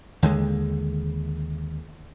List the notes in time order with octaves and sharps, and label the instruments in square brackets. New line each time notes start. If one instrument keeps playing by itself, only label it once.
[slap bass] D#2 D3 G#3